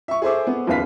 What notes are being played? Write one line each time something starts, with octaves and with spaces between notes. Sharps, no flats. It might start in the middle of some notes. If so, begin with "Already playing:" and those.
E5 C#6
G#4 A4 C5 E5 D6
B3
F#1 D#2 B4 F5 B6